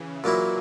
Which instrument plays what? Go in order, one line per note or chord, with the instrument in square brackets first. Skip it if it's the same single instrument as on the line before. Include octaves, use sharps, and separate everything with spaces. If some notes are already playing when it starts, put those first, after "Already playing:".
Already playing: [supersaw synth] C#3 E3
[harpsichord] A#2 F#3 A#3 E4